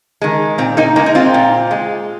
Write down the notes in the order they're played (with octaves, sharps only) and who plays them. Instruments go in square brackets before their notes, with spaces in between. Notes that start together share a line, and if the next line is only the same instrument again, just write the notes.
[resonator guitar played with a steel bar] D#3 G#3
A#2 C4
A#3 D#4
G#3 A#3 D#4
D#4
C4 F4
A#2
G#3